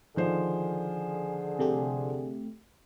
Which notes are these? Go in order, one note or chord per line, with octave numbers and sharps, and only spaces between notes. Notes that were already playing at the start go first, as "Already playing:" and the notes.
D3 D#3 F3 G#4 C5
C3 A3 G4